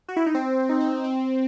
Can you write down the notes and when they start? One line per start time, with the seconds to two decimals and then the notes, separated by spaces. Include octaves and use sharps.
0.08 F#4
0.16 E4
0.26 D#4
0.35 C4
0.69 D#4
0.80 C4
1.04 C4